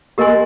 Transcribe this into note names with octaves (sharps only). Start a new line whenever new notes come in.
A#3 G4 A#4 D#5 G#5 C6